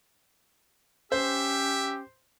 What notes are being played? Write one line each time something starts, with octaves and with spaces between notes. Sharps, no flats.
C#4 G4 C5 E5